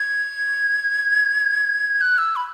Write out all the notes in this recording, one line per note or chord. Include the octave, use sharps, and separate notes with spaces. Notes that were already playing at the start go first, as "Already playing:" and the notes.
Already playing: G#6
F#6
E6
B5